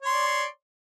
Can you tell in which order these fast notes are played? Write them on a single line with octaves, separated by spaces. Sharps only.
C#5 C6 D5